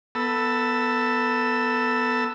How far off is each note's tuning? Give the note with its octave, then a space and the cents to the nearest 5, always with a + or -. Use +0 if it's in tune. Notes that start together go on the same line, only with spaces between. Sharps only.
B3 +0 A4 +20 E6 +0